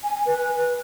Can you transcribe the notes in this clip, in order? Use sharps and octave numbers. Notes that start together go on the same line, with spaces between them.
G#5
G#5
B4